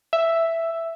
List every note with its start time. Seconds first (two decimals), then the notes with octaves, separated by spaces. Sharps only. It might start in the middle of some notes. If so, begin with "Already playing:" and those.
0.13 E5